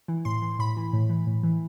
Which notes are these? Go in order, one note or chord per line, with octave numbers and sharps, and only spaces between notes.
E3
A2 C6
E3
A2 B5
E3
A2
E3
A2
E3